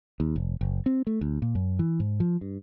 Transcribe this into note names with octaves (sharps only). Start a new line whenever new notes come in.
D#2
F1
F#1
C4
A3
D2
A#2
F#2
E3
G#2
F3
G2